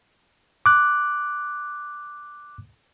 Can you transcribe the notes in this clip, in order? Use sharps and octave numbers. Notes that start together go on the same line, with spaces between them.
D6 F#6